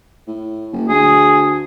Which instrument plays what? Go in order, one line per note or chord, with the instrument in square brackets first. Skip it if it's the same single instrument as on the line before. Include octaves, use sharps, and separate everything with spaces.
[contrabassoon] A2
F#1
[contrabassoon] D2 [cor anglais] G#4